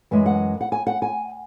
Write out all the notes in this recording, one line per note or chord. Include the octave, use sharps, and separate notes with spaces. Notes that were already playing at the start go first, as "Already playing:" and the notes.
F#2 E3 G#3 E5
F#5
F#5
G#5
F#5
G#5